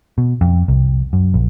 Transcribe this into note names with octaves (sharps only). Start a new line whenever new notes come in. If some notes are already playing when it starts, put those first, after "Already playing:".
B2
F2
C2
F#2
A#1